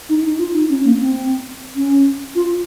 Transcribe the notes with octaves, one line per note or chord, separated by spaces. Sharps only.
D#4
D#4
F4
D#4
C#4
A#3
C4
C#4
F4